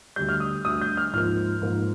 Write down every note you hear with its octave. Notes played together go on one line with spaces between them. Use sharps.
D2 D3 G3 G6
F6
D#6
D2 D3 G3 D#6
G6
F6
G#2 F3 A#3 F6
G#2 F3 A#3